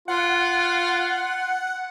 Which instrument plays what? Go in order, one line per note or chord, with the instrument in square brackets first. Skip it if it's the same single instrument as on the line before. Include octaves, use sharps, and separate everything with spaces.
[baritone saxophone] F4 [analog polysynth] F#5